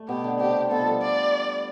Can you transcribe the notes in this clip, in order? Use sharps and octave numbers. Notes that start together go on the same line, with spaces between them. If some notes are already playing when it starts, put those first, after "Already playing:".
Already playing: A3
B2 B3 G4
D3 D4
C3 C4 G4
B2 B3 A4
F3
G3
D5